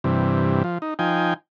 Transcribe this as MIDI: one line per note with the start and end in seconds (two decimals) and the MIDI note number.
0.04 0.63 43
0.04 0.63 48
0.04 0.63 52
0.64 0.78 53
0.82 0.94 63
0.99 1.34 53
0.99 1.34 63
0.99 1.34 79
0.99 1.34 80